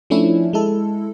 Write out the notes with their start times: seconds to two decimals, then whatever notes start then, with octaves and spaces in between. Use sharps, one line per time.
0.10 F3 A3 C#4 D4 E4
0.53 G#3 E4 A4